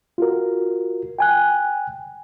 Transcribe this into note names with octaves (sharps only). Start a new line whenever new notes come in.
F4 F#4 A#4
G5 G#5 F#6